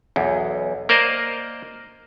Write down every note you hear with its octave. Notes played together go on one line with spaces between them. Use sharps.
B1 E2
A#3 A#4 C5 D5 D#5